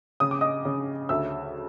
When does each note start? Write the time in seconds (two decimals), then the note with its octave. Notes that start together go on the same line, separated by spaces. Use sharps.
0.20 C#3 D#6
0.31 D6
0.41 D#5 D#6
0.65 C#3
1.09 D2 E5 E6